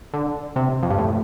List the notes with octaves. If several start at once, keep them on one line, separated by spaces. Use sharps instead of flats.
D3
C3
F2
G2
A2